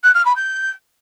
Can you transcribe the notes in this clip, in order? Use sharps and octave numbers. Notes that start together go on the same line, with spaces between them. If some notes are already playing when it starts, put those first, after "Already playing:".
F#6
F6
B5
G6